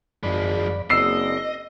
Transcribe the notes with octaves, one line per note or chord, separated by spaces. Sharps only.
G#1 F#2 F3 G#3 D5 B5
F#1 A#3 C4 D5 D#5 E6 C7